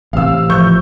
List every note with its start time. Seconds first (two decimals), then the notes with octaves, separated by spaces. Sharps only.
0.13 A1 C3 F5 E6
0.50 F3 C#6 G6